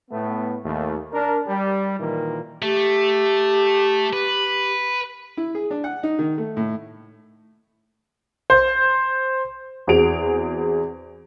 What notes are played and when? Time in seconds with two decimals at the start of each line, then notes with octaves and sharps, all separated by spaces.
0.11 A2 A3 B3
0.64 D#2 A3
1.13 D4 A#4
1.47 G3
1.99 A#2 D#3 E3 A#3
2.62 A3 G4
4.13 B4
5.37 E4
5.55 G#4
5.71 D4
5.84 F#5
6.03 D#4
6.19 D#3
6.38 A3
6.57 A2
8.50 C5
9.87 E2 C4 F#4 G#4 D7 F7